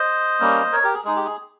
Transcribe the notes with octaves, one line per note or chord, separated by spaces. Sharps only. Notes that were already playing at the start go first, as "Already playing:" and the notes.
Already playing: C5 D#5
G3 A#3 C#4
A#4 C#5
G4 A#4
G#4
G#3 D#4 G#4
G4
G#4